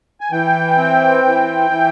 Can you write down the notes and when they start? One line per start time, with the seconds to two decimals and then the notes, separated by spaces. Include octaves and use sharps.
0.21 G#5
0.32 E3 G5
0.78 C4
1.24 E3
1.71 E3